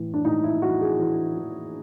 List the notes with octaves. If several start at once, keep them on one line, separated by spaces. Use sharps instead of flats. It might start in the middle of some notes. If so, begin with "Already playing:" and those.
Already playing: A2 E3
D4
A2 D#4
E4
E3 F#4
G#4
E3
E3